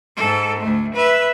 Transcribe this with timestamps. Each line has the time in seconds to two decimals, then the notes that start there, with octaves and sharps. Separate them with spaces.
0.17 G#2 A4
0.60 D2 A3
0.95 B4 E5